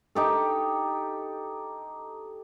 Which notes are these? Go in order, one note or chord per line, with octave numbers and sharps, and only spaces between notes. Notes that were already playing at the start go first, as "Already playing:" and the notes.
D#4 G4 A4